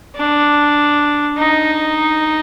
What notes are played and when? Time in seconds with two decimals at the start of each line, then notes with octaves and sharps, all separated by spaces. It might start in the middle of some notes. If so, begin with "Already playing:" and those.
0.16 D4
1.38 D#4